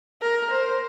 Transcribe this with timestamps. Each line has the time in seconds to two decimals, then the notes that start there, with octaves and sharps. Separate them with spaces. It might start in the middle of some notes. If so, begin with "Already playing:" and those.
0.22 A#4
0.51 C5